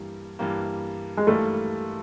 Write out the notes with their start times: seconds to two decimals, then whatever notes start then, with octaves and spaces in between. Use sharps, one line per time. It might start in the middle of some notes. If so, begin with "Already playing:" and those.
Already playing: G2 E3 G3 A#3
0.39 G2 E3 G3 A#3
1.17 G#3
1.27 G2 E3 G3 A3 A#3